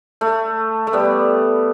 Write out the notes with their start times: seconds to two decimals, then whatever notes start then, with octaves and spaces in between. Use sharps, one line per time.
0.21 A3
0.87 A3
0.93 G3 B3